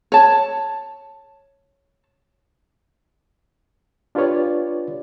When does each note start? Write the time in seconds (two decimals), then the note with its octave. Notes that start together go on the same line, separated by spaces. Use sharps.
0.12 C#5 A5
4.15 D4 F4 G4 B4 C#5 D5